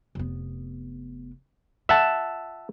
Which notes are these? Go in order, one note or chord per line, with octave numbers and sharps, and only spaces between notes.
F1 B3
F4 E5 F#5 A5